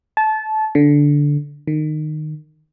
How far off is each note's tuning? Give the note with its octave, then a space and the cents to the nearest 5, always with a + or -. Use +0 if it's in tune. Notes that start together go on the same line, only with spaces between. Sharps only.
A5 -20
D3 -10
D#3 -20